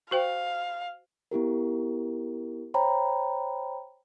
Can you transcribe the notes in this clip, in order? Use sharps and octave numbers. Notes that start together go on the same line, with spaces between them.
F#4 C5 F5 G5
B3 E4 G4 A#4
C5 C#5 G5 A#5 B5